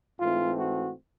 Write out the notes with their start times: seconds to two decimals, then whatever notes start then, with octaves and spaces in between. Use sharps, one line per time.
0.20 G#2 E3 A3 C4 F4
0.57 F#4